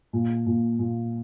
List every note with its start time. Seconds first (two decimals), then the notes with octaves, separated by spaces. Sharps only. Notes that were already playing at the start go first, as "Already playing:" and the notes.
0.13 A#2
0.46 A#2
0.79 A#2